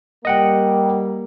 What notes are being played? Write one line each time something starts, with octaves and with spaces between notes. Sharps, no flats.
G3 A#3 D#5 F#5 G5